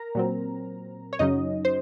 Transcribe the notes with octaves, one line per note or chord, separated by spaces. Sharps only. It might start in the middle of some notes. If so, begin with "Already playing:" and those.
Already playing: A#4 A#5
A#2 F#3 C4
C#5
F#2 C#3 F#3 C#4 D#4 D#5
C5